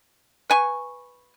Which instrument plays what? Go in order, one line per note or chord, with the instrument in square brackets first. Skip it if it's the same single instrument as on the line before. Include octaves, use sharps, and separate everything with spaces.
[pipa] B4 G#5 C#6